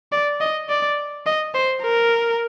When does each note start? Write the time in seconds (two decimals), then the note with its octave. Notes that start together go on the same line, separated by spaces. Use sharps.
0.12 D5
0.41 D#5
0.69 D5
1.26 D#5
1.54 C5
1.82 A#4